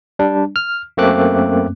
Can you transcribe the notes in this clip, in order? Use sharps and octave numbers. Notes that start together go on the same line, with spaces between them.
G3 D4
F6
F#2 A3 A#3 C4 D6 F#6